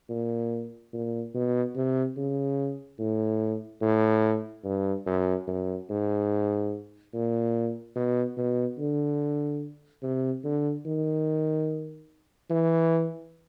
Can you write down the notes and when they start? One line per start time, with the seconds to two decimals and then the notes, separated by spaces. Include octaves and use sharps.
0.10 A#2
0.93 A#2
1.34 B2
1.76 C3
2.17 C#3
2.99 A2
3.82 A2
4.65 G2
5.06 F#2
5.48 F#2
5.90 G#2
7.14 A#2
7.96 B2
8.37 B2
8.79 D3
10.03 C3
10.44 D3
10.86 D#3
12.50 E3